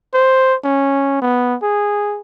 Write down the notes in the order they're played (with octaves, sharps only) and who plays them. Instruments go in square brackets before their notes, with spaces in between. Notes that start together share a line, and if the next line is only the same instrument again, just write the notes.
[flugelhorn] C5
C#4
B3
G#4